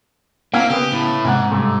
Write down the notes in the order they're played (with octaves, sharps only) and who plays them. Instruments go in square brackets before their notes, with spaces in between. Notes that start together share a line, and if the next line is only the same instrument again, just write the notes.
[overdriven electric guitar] A#3 [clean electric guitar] C4 E4 F5
[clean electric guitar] C#3 B3 B4 [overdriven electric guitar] G4
[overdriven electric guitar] A2
[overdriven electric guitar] G#2 [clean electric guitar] C3 A#3 F#5
[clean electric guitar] G2 C3 A3